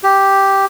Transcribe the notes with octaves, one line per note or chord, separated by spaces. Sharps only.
G4